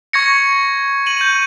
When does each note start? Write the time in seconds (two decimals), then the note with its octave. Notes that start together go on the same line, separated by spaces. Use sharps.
0.13 C#6 G#6 A#6 C#7
1.06 D#7 F#7
1.21 G6